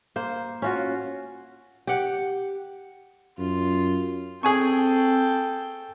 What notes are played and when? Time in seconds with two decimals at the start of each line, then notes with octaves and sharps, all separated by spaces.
0.16 A#3 C5
0.62 C#4 F4 F#4
1.87 G4 F#5
3.38 F#2 F4
4.43 C4 G#4 A4 G5 G#5 C#6